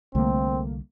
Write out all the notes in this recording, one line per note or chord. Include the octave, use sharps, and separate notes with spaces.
C2 D3 G3 A3 A#3 C4